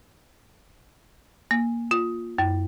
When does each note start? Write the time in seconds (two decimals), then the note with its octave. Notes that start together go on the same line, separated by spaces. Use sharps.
1.51 A#3
1.91 F4
2.38 F#2